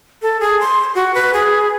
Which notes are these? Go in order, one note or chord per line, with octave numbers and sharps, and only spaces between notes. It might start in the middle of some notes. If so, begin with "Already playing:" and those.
A4
G#4
C6
F#4
B4
G#4